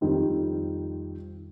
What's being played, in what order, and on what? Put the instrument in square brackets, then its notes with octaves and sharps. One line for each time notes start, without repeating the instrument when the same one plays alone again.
[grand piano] F2 D#3 G3 C4 F4